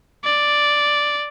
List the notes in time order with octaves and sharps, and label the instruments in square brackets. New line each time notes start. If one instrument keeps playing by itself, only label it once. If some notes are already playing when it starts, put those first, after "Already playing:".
[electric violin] D5